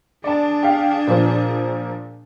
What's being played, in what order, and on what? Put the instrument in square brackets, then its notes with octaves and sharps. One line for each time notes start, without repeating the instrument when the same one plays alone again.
[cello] D4 G#4 [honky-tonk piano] D5 A5
[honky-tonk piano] G4 F5
A#2 F3